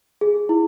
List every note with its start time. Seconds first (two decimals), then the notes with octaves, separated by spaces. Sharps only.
0.21 G#4
0.49 E4